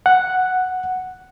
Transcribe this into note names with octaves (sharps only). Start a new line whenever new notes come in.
F#5